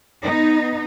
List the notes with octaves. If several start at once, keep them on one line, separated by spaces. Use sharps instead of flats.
B3 D#4